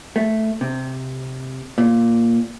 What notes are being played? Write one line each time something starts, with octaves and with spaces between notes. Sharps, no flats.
A3
C3
A#2